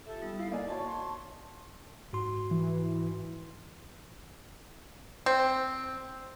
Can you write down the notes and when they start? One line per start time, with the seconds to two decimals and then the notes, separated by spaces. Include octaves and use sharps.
0.06 F4 G4 A4 E5
0.22 G3 B3 D#4
0.39 D#4 E4 F5
0.52 A#3 D#4 D5 D#5 G#5
0.68 F#4 C#5 A5 C#6
0.86 C6
2.13 G#2 F#4 C6
2.51 E3
5.26 C4